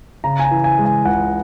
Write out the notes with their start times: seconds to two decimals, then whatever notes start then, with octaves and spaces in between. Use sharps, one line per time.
0.24 C#3 A#5
0.39 G#5
0.44 A#5
0.51 E3
0.64 G#5
0.78 G#3
0.85 G#5
1.05 C#2 F#5